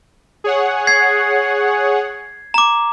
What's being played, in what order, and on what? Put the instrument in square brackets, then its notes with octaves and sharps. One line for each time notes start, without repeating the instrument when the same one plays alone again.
[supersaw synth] G#4 C#5 F#5
[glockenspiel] G#6 C7
A#5 D6